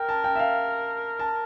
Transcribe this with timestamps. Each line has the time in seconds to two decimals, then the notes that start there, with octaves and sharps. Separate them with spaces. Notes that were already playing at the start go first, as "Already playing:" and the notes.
Already playing: A#4 G5
0.09 A5
0.24 G5
0.35 E5
0.39 F5
1.19 A5